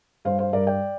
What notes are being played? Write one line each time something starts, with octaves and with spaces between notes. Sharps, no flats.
G2 C5 F5
C5 F5
G2 A#4 D5
D5 G5